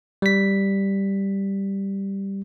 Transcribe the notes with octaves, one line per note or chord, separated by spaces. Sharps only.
G3 B6